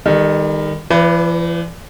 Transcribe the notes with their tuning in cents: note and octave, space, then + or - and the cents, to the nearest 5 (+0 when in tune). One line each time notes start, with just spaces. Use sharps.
D#3 +0 G3 +40 A4 +0
E3 +45 B4 +0 D5 -15